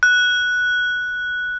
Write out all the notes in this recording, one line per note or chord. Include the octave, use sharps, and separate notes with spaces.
F#6